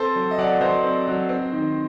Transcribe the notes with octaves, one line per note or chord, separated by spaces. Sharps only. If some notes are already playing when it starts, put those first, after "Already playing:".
Already playing: C4 A4 C5
F#3
D#5
F#3 D5 F#5
F#3 C5 D#5
C4
F#3
C4
D#3